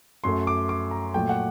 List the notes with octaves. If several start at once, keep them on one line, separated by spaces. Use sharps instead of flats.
F#2 F#3 A3 C6
D6
D6
A#5
A#2 F#3 A3 G5
F#5